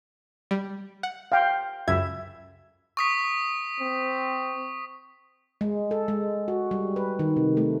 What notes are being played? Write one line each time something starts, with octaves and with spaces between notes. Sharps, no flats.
G3
F#5
F5 G5
C#2 F#2 E5 G#6
C#6 D#6 B6
C4
G#3
A4
G#3
F#4
G3
B4
D#3
C3
A3